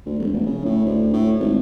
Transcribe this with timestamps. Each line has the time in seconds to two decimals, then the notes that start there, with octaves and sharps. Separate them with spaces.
0.06 D2
0.20 E1
0.32 F1
0.47 C#3
0.66 A2
0.85 D2
1.14 A2
1.40 G#1